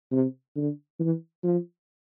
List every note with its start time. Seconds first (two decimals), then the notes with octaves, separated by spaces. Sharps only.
0.12 C3
0.56 D3
1.00 E3
1.44 F3